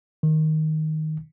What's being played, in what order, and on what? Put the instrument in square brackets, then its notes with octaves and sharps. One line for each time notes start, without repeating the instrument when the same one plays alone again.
[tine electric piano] D#3